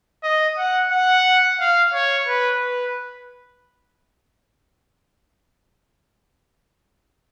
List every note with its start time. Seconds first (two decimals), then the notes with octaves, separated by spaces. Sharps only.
0.23 D#5
0.58 F#5
0.92 F#5
1.60 F5
1.94 C#5
2.28 B4
2.63 B4